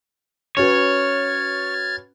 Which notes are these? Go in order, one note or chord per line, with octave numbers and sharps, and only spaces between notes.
C#4 F#4 B4 C#5 F6 G#6 A6